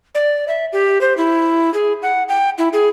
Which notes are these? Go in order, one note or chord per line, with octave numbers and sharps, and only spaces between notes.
D5
E5
G4
C5
E4
G#4
F#5
G5
E4
G#4